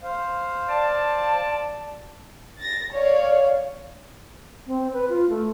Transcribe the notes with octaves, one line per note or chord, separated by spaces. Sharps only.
C5 F5
D5 A5
A6 A#6
C#5 D5 F5
C4
B4
F4
A3